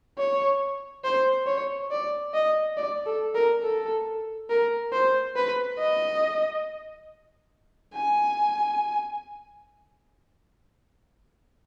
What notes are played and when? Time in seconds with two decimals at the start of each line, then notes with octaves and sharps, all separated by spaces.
0.18 C#5
1.04 C5
1.47 C#5
1.91 D5
2.34 D#5
2.77 D5
3.06 A4
3.35 A#4
3.63 A4
4.50 A#4
4.92 C5
5.36 B4
5.79 D#5
7.95 G#5